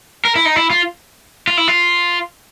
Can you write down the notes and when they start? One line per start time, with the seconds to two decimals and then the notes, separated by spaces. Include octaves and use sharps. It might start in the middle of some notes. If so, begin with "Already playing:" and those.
0.25 A#4
0.36 E4
0.45 D#4
0.56 E4
0.70 F4
1.47 F4
1.57 E4
1.68 F4